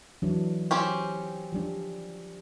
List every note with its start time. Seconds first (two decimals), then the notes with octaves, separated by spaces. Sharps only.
0.22 E3 F#3 D4
0.71 C4 C#4 G4
1.52 F3 G3 D4